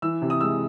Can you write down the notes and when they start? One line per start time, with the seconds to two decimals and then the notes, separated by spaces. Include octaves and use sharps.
0.02 E3 E6
0.22 C3
0.30 D#6
0.41 G#3 E6